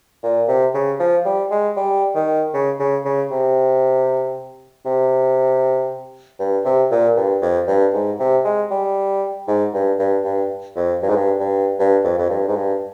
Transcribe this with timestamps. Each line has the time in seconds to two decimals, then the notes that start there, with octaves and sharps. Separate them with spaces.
0.23 A#2
0.48 C3
0.74 C#3
1.00 F3
1.26 G3
1.51 G#3
1.77 G3
2.15 D#3
2.54 C#3
2.80 C#3
3.05 C#3
3.31 C3
4.86 C3
6.40 G2
6.65 C3
6.91 A#2
7.17 G2
7.42 F2
7.68 G2
7.94 G#2
8.20 C3
8.45 G#3
8.71 G3
9.48 G#2
9.74 G2
9.99 G2
10.25 G2
10.76 F2
11.02 G2
11.09 G#2
11.16 G2
11.40 G2
11.79 G2
12.04 F2
12.18 F2
12.30 G2
12.48 G#2
12.56 G2